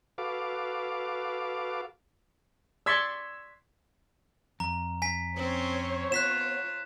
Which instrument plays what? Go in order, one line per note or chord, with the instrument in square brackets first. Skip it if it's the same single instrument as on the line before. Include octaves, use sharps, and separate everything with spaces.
[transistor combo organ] F#4 A4 B4 F5 D6
[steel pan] D5 C6 C#6 [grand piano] E6 G#6 B6
[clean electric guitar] F2 [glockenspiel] A#5
[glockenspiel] G#5 B6
[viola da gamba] C4 C#4 [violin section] C5 C#5
[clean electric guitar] B3 [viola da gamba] F4 [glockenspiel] F#6 B6 E7